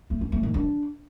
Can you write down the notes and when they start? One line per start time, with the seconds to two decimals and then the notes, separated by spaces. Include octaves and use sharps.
0.10 A3
0.21 C#4
0.32 A3
0.43 D#3
0.54 D4